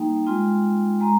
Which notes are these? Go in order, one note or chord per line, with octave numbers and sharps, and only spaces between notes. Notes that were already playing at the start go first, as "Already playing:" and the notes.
Already playing: G3 A#3 D#4 G5
G#3 C4 F4
G#3 C4 A#5